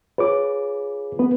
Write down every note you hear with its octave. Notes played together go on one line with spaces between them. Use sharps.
F4 G#4 B4 C#5 D6
B3 B4